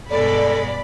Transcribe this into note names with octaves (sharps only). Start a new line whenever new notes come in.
G2 B2 G#3 A4 D5 B5